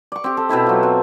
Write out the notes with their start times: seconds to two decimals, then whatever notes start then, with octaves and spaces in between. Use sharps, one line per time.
0.12 D5 C#6
0.24 C4 G4
0.37 A4
0.49 B2 C4 E4 E5
0.66 F#3 F4
0.83 F#4